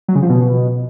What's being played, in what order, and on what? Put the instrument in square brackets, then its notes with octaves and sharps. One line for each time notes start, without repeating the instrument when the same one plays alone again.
[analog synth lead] F#3
C#3
F3
B2